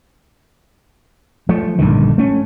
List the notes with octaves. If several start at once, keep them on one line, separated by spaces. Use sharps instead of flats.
F3 A3
A#1 G2 D3 D#3
A3 C#4